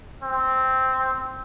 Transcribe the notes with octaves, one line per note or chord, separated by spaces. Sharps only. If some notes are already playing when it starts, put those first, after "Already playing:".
C4